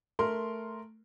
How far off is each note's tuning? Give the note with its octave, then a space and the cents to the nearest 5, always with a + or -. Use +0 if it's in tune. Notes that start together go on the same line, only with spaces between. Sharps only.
A3 +0 A#4 +0 C6 +0